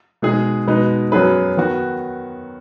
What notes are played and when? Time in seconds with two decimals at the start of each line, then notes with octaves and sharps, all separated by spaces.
0.22 B2 G#3 D#4 G#4
0.67 B2 G#3 D#4 B4
1.12 F#2 F#3 B3 G#4 B4
1.57 D#3 B3 F#4